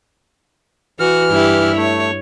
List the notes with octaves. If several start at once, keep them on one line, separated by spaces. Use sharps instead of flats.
E3 F#4 F6
G2 E4 G4
A3 C#5